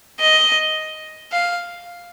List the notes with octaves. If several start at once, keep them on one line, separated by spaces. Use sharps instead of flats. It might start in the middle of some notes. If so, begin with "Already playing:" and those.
D#5
F5